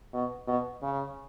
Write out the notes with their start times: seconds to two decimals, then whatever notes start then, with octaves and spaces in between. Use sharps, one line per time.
0.14 B2
0.47 B2
0.83 C#3